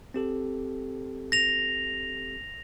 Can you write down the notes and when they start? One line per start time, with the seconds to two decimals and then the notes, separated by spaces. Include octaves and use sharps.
0.14 C4 G4 A4
1.32 A#6 F7